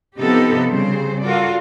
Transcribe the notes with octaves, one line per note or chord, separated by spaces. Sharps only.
C3 F3 B3 D#4 G4 A4
C#3 G3 C4 C5
F4 F#4 A4 A#4 D5